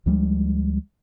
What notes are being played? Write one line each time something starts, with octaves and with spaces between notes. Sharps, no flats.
D2 F3 G3 G#3